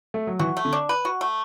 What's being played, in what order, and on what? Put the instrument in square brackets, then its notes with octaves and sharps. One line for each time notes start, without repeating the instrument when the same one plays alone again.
[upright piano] A3
F#3
[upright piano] E3 [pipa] F#4
[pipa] A3
[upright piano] D3
[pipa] D4
B4
F#4
A3